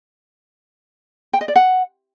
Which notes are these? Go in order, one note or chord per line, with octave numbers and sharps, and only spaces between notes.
G5
D#5
D5
F#5